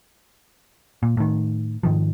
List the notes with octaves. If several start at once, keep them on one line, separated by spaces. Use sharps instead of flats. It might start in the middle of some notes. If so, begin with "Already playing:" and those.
A#2
A2 D#3
G#2 D#3 F3